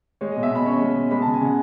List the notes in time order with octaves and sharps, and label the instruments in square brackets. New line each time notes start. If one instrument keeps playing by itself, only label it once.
[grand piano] G#3 C#5
D#5
B2
E5
B2 B5
C#4 C#6
G#3
B2
G#3 B5
A5
C#3
G#5
C#3 F#5